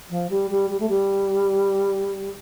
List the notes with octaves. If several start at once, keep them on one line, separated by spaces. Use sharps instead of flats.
F3
G3
G3
G3
A3
G3